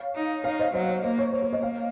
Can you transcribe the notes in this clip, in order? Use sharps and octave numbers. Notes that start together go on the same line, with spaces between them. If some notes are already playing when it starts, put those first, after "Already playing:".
Already playing: C#5 F5
D#4
D#4 C#5 F5
C5 D#5
F#3 C5 D#5
C#5
A#3 C5
C#5
A#3 C5
C#5
C5 D#5
C#5 F5